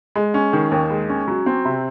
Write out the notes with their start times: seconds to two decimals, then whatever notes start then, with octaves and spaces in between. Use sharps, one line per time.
0.15 G#3
0.34 C#4
0.53 D#3
0.71 D#2
0.90 G#3
1.09 C#4
1.28 F#3
1.46 C4
1.65 C3